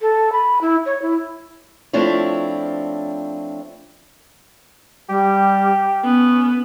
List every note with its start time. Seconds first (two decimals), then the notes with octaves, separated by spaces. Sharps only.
0.01 A4
0.33 B5
0.61 E4
0.86 C#5
1.02 E4
1.93 F3 A3 C4 D4 E4 C#5
5.09 G3 G4
6.04 B3 C#4